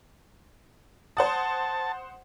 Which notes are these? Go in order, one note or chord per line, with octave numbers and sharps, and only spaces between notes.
C5 F#5 A5 D#6